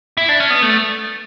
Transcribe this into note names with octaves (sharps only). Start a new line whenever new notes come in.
E4
D4
C#4
B3
A3